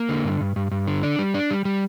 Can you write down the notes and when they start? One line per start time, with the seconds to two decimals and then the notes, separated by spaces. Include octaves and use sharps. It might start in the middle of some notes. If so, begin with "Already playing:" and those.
Already playing: A#3
0.09 D3
0.24 G2
0.41 G2
0.56 G2
0.71 G2
0.88 D3
1.03 D4
1.19 G3
1.34 D4
1.51 G3
1.65 G3